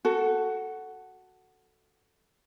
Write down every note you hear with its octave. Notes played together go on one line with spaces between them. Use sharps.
F#4 A4